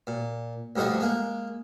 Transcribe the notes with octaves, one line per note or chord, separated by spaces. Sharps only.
A#2
D2 G2 D3 F3 D#5 C#6
G#3 A#3